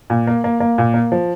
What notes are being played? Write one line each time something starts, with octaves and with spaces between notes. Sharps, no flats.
A#2
A#3
A#3
A#3
A#2
A#3
F3